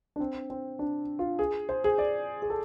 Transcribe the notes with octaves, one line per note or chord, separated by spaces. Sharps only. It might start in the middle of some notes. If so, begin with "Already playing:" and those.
D4
C4
C4
D4
F4
G#4
C5
G#4
D5
G#4
A4